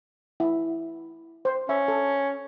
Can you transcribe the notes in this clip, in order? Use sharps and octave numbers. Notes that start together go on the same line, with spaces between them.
E4
C5
C#4 E5
A4